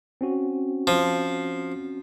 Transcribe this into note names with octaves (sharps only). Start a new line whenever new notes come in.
C4 C#4 F#4
F3